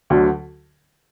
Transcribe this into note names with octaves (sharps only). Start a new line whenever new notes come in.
D2 D3 F#3